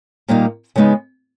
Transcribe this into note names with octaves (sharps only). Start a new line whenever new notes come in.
A#2 G3 A#3 D#4
C#3 G#3 B3 D#4